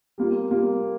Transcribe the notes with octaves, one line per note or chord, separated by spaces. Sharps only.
G3 A#3 F4
G3 A#3 F4